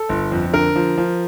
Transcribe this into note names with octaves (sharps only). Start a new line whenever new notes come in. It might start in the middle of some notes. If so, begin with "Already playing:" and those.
Already playing: A4
G1
F2
D3 A#4
F3
F3